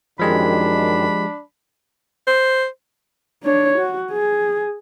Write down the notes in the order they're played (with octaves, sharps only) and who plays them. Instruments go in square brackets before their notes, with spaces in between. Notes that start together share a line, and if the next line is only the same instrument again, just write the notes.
[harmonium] F#2 D#3 [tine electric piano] F3 G#3 G4 [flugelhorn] D4 [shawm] B5
[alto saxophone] C5
[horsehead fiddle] D4 C#5
F#4
G#4